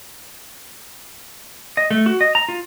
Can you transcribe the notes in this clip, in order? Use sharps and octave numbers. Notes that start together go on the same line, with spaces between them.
D#5
A3
F#4
D#5
A#5
F4